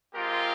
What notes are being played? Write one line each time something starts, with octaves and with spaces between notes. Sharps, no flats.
G#3 C4 F4 G4 A#4